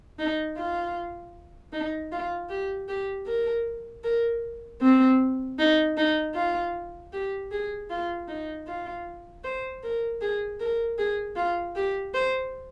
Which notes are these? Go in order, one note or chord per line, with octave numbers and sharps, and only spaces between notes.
D#4
F4
D#4
F4
G4
G4
A#4
A#4
C4
D#4
D#4
F4
G4
G#4
F4
D#4
F4
C5
A#4
G#4
A#4
G#4
F4
G4
C5